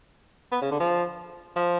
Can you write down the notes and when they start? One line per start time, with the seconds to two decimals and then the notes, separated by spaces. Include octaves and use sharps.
0.52 B3
0.62 C#3
0.71 D3
0.80 F3
1.56 F3